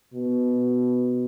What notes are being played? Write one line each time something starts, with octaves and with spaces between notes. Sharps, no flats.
B2